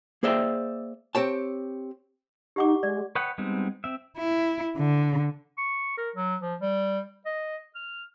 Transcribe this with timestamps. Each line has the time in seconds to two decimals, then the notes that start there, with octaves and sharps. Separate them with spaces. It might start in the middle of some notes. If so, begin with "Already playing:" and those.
0.23 A#3 G#4 C5 D5 E5 G5
1.15 C4 G4 C#5 A5
2.56 D#4 G4 F#5 D6
2.83 G#3 D5
3.15 B4 C#5 D#5 F#5 G5
3.38 G3 G#3 B3 C4 D#4
3.84 C4 E5
4.18 E4
4.77 D3
5.58 C#6
5.97 A#4
6.16 F#3
6.41 F3
6.61 G3
7.26 D#5
7.75 F6